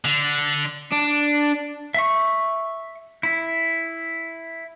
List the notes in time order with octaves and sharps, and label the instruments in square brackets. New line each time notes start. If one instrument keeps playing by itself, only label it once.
[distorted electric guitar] D3
[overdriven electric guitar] D4
[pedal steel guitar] E5 C#6
E4